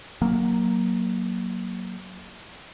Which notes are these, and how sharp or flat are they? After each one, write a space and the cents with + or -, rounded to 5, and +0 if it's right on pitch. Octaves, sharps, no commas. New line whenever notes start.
F#3 +0 A#3 +5